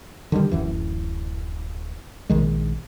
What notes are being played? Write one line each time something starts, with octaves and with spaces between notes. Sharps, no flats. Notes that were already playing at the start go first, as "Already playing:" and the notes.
D3 D#3 F3 G3
D1 F#2 E3
A#1 D#3 G#3